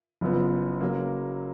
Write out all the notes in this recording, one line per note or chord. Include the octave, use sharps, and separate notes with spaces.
F#1 F#2 F3 B3
C#3 F#3 A#3